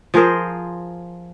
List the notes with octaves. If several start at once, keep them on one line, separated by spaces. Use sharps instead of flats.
F3 G#4 A#4 C5